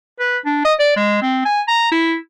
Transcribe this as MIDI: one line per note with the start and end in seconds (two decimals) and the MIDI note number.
0.20 0.38 71
0.46 0.62 62
0.65 0.74 75
0.80 0.93 74
0.97 1.21 56
1.22 1.44 60
1.45 1.62 80
1.68 1.89 82
1.92 2.15 64